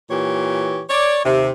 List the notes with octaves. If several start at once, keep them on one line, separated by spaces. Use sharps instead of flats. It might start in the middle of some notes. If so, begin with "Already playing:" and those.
A#2 E3 G4 C#5
C#5 D5
D#2 C3